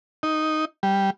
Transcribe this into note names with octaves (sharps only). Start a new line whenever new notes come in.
D#4
G3